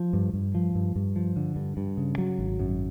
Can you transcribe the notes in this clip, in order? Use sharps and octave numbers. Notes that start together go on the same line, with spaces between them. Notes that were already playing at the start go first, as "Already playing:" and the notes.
Already playing: F3
G2
G2
F3
G2
G2
F3
D3
G2
G2
C#3
F#3
G#1
F#2